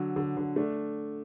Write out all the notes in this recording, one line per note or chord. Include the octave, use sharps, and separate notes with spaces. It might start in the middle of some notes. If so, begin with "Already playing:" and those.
Already playing: D3 F#3
D3
D3
A3 D4